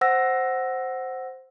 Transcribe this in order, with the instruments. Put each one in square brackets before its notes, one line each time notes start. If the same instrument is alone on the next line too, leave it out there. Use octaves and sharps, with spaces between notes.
[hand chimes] C5 F#5 E6 A#6